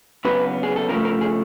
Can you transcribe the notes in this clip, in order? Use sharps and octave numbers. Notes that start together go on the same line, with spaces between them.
C#3 F#3 B3 B4
G#4
A4
C#3 F3 A3 A#4
A#4
G#4